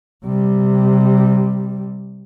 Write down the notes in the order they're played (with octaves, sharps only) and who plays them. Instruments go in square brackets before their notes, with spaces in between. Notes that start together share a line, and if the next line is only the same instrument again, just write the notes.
[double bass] C3 G3